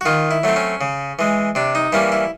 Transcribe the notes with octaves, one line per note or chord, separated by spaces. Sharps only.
F#4
D#3 F4
E4
F#3 A3 C4
C#4
C#3
E3 G#3
C3 D4
D#4
E3 G3 A#3 C#4 E4
E4